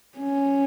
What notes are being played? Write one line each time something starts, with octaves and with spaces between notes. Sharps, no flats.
C#4